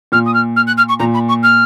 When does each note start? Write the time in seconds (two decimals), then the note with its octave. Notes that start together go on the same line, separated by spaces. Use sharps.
0.12 A#2 F6
0.26 D#6
0.34 F6
0.56 F6
0.67 F#6
0.77 F6
0.88 C#6
0.99 A#2 A#5
1.14 B5
1.28 C#6
1.43 F6